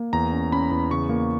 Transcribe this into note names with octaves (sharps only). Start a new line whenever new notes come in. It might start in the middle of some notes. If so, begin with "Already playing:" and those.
Already playing: A#3
E2 A#5
C#4
C#4 B5
E2
C#3 C#6
A#3